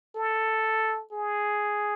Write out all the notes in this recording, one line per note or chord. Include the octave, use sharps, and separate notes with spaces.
A4
G#4